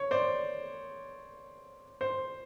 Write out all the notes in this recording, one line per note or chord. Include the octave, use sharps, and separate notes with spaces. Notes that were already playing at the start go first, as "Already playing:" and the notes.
Already playing: C#5
C5 D5
C5